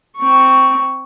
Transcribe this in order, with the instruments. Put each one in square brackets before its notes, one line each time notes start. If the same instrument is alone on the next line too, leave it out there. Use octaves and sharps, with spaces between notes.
[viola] C4 C#6